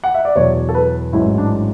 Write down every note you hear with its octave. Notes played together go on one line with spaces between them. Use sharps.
F#5
E5
D5
E2 B2 F#3 C#5
A4
B4
A1 G#2 F#3 E4
D4